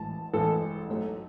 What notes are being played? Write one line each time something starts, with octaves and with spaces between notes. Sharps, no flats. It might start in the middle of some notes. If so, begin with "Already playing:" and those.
Already playing: A1 A2 G#3 A5
A1 A2 G#3 A4
G#2 F#3 A3